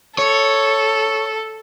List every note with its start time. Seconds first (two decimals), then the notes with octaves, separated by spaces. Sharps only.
0.18 A4 C#5